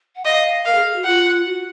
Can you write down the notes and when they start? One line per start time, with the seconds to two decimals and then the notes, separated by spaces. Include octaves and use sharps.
0.16 F#5
0.25 D#5 F5
0.65 A#4 F5
0.75 G#4
0.85 G#4
0.95 F#4
1.04 F4 F#5
1.45 F#4